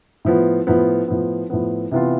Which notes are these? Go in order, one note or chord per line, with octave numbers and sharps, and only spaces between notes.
A2 F3 B3
A2 F3 B3
A2 F3 B3
A2 F3 B3
C3 E3 B3 F4